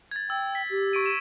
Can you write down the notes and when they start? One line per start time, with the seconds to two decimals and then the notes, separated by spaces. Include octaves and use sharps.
0.11 G#6 A6
0.30 G5 E6
0.55 B6
0.70 G4
0.93 C#6 D7 D#7
1.06 D#7 E7